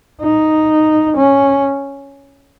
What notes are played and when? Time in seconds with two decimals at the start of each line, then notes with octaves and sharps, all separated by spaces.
0.21 D#4
1.17 C#4